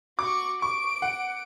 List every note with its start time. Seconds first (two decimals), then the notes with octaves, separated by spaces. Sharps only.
0.19 F#4 C#6 D6
0.62 C#6 D7
1.02 F#5